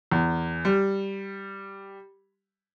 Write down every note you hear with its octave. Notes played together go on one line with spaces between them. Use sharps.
E2
G3